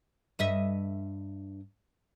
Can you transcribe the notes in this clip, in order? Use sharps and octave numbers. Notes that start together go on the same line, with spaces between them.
G2 D#5 E5